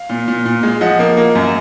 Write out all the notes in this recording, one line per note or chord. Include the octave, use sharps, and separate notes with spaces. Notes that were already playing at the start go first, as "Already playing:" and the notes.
Already playing: F5
A#2
A#2
A#2
G#3
F3 D#5 F#5
A#3
A#3
F#2